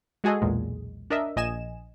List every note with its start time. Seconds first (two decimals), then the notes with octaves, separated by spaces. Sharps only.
0.24 G#3 F#4 G#4 A4 D#5
0.42 B1 E2 A#2 G#3
1.10 D4 A#4 D#5 E5
1.36 A#1 D#5 G#5 E7